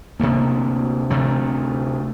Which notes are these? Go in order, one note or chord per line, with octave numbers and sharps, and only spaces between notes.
D2 C3 A#3
D2 C3 A3